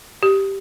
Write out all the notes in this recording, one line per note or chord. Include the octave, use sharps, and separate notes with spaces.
G4